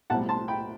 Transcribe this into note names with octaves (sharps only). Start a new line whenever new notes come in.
B1 A2 G3 C4 F#5 A5
A5 C6
G5 B5